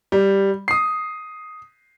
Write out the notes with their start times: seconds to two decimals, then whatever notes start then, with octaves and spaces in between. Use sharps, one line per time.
0.12 G3
0.68 D#6 C7